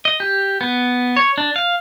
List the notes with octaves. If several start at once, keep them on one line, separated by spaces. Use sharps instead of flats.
D#5
G4
B3
C#5
D4
F5